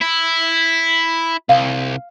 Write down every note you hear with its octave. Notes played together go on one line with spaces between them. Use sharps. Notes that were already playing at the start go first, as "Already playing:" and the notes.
E4
C2 F5